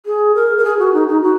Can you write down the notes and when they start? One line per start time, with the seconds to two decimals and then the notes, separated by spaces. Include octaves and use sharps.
0.06 G#4
0.35 A#4
0.58 A#4
0.64 G#4
0.79 F#4
0.94 D#4
1.08 D#4
1.22 F#4